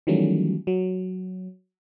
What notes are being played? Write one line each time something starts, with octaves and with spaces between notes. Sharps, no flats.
D#3 E3 F#3 G3 A3 C#4
F#3